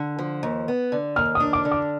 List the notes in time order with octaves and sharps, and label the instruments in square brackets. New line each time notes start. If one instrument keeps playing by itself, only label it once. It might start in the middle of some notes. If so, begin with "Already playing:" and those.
Already playing: [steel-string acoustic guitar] D3
F3
D#2
B3
D3
[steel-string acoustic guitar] D#2 [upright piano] F6
[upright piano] D#6
[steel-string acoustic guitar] D4
[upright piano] D6
[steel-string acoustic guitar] D3
[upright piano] D6